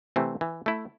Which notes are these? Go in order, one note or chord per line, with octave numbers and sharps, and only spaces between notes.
C3 E3 A3 C4
E3
A3 E4